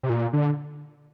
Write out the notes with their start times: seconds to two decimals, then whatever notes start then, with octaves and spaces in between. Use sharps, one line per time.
0.03 C3
0.10 A#2
0.33 D3